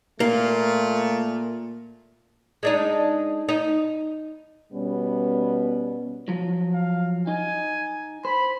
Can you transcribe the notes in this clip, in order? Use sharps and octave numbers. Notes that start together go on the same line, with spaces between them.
A#2 A3 A#3
G#3 D4 D#4
D#4
B2 G3 B3 C#4
F3 F#3
F5
D#4 G#5
C5 B5